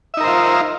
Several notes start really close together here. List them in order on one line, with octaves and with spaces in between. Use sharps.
E5 D#4 A#4 C5 F4